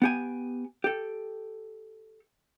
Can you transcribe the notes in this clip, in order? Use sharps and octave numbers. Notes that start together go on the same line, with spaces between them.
B3 G4 G#5
G4 A4